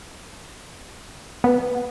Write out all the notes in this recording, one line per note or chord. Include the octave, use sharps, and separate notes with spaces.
B3